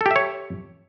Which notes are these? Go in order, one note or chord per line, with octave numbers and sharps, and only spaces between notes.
G4 A4 C#5 E5